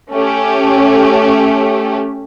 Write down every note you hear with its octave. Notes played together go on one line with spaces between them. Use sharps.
A3 C#4 G4